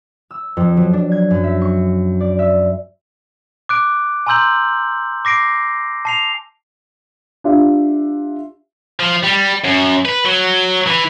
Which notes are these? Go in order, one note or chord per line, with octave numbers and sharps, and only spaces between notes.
E6
F2
F#3
D4
G#6
F#2
E5
C#6
D5
E5
D6 F#6 D7
G#5 A#5 C6 E6 G6 F#7
D6 A#6 C7 D7
A5 C7 F7
D4 F4 G4 E5
F3
G3
F#2
B4
F#3
E3